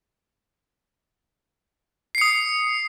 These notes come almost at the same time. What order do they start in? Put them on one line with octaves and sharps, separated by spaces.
C7 C#7 D#6